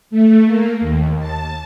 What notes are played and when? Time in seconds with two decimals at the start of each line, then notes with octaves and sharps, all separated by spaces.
0.10 A3
0.45 A#3
0.81 D#2
1.19 A5